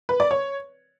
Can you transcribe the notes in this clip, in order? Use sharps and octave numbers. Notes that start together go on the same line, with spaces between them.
B4
D5
C#5